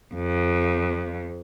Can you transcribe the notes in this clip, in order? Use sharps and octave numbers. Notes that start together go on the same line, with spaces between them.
F2